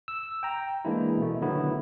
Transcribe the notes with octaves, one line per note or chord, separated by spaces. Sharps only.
E6
G5 A#5
E3 G#3 A#3 D4 E4
B2 A3
D3 D#3 F#3 A3 B3 E4